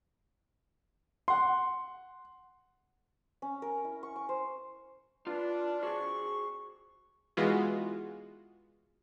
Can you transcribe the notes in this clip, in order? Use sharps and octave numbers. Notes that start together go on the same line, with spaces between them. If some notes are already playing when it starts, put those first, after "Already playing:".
F#5 C6
C#4
A#4
E4
C#6
C#6
C5
D4 F4 B4
F#4 G#4 C5 C#6
E3 G#3 B3 F4 F#4